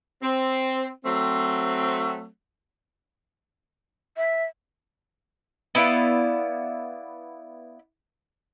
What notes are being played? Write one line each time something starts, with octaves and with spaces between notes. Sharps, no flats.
C4
F#3 A3 C4
E5
B3 E4 D5 F5